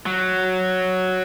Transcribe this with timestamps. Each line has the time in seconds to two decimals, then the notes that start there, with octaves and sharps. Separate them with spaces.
0.06 F#3